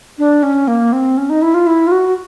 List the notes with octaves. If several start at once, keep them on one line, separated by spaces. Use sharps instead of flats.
D4
C#4
A#3
C4
C#4
D#4
E4
F4
E4
F4
F#4